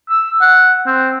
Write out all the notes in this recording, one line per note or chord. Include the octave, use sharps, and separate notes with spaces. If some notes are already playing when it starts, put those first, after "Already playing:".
E6
F#5
C4